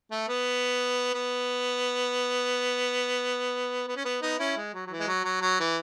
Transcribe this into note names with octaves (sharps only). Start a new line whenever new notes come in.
A3
B3
B3
B3
C#4
B3
B3 D#4
C#4 E4
G#3
F#3
F#3
E3
G#3
F#3
F#3
F#3
E3